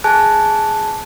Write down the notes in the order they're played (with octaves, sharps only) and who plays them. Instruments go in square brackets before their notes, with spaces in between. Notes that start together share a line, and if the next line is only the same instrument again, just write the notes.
[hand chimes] G#4 G#5 A5 F#6